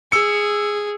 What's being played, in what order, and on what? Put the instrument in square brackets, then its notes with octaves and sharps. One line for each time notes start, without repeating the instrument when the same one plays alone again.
[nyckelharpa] G#4 [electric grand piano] E6 C#7